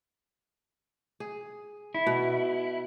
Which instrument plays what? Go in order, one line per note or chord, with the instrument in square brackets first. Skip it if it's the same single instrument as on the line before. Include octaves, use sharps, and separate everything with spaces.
[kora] G#4
[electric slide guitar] E4
[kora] B2